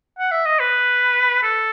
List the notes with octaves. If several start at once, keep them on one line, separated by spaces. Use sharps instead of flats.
F#5
E5
D#5
B4
A4